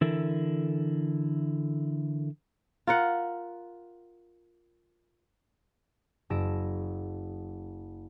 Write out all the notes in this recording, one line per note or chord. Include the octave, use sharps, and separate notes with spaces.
D3 E3 E4 A4 A#4
F4 A#4 F#5
F#1 A5 E6 A#6 D7 E7